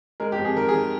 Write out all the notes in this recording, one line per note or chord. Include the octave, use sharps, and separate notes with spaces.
G#3 A#4
G4
F2
G#4
D#3 A#4
G#4
D#3